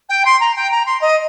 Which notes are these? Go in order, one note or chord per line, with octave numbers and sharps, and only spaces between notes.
G5
C6
A#5
G5
A#5
C6
D#5